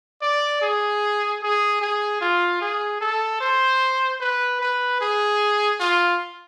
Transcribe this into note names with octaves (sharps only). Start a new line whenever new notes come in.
D5
G#4
G#4
G#4
F4
G#4
A4
C5
B4
B4
G#4
F4